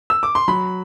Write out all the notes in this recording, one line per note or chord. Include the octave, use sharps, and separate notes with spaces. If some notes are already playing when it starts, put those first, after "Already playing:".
E6
D6
C6
F#3 B5